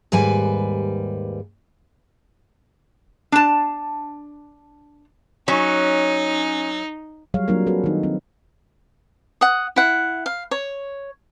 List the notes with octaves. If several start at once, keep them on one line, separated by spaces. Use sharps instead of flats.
D#2 G#2 G3 B4 G#5
D4 A5
F#3 C#4 D#4
F#3 G3 G#4 C#5 F5
F#3 A#3 C4 D4 F4 A#4
C4 F#4 G#4 A4 B4
D#3 D#4
C4
F#5 D#6
E4 F#5
F5
C#5